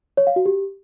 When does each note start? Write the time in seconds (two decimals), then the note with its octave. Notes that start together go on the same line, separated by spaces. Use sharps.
0.17 C#5
0.27 F5
0.36 F#4
0.46 G4